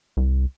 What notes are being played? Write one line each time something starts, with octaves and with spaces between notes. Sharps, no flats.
C2